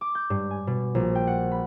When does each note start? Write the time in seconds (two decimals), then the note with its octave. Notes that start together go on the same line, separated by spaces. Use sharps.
0.01 D6
0.15 G6
0.30 G2
0.51 G#5
0.67 B2
0.95 A#1
1.15 G5
1.27 F#5
1.51 B5